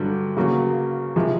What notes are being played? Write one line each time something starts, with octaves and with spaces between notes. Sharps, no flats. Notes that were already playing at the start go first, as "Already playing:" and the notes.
Already playing: G2 D3 F#3
C#3 F#3 A#3
C3 F3 G#3